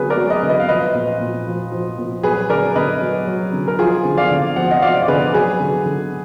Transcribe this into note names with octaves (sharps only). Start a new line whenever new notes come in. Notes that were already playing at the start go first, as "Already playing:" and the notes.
Already playing: D3 F#3 G#4 B4
A#4 D5
F#3
B4 D#5
D3
B4 D#5
F5
F3 B4 D#5
A#2
A#2
F3
F3
A#2
F#3 G#4 B4
D3 A#4 D5
D3 B4 D#5
F#3
F#3
D3
A#4
F3 F4 G#4
D3
D5 F5
D3
F3 F#5
D#5 F#5
F3 D5 F5
D5
D3 G#4 B4
F#3 G#4 B4
D3
D3